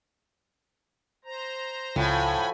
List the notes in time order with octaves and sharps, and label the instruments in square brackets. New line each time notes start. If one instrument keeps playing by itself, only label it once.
[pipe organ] C5 A#5
[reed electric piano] C#2 [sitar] A2 [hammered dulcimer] F3 F#4 [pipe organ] G#5 B5